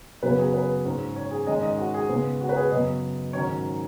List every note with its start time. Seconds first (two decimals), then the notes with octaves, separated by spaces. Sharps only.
0.23 F#2 C#3 F#3 B3 B4
0.38 G#4
0.54 B4
0.84 G#2 G#3 C#4
1.16 C#5
1.31 G#4
1.47 G#2 D#3 G#3 C#4 D#5
1.63 D#5
1.78 F#4
1.94 G#4
2.09 C#3 G#3 B3
2.40 F#4
2.49 B4
2.56 G#4
2.71 F#2 C#3 B3 D#5
3.33 G#2 D#3 F#3 C#4 C#5